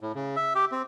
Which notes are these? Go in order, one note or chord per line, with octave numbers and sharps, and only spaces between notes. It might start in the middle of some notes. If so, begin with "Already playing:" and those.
A2
C#3
E5
G4
C4